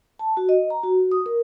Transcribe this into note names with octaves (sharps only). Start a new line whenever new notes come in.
A5
F#4
D#5
A#5
F#4
D#6
A#4